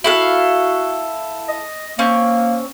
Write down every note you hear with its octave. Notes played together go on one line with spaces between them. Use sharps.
E4 F#4 A4 F5
D#5
A#3 C4 C#4